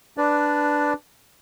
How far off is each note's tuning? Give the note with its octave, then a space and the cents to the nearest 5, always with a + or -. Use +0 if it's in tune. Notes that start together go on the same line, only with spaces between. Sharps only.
D4 +0 B4 +0 D5 +0